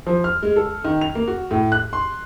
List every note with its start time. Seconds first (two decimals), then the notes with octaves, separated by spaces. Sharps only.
0.07 F3
0.24 F6
0.42 G#3
0.56 A4
0.84 D#3
1.01 F7
1.15 A#3
1.28 F#4
1.51 A2
1.72 F#6
1.93 C6